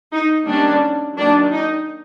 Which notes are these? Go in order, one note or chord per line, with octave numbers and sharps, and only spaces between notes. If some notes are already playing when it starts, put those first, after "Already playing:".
D#4
D#3 G3 A#3 C#4 D4
D#3 F#3 A#3 D4
D#4